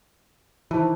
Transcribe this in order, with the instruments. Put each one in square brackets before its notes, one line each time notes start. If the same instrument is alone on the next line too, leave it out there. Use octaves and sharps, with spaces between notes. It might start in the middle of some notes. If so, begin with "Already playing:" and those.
[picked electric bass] D#3 E3 [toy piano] C5 A5 B5